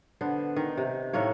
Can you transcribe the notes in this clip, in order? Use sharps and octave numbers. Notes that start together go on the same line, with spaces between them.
D3 B3 C5
D#3
C3
A2 D#3 A#3 C#5